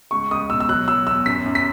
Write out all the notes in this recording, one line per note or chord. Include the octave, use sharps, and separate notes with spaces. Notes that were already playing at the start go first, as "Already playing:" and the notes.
C#2 C#6
C#2 D#6
B2 E6
E6
F#3 F#6
F#3 E6
E2 E6
F#2 B6
F#2
B6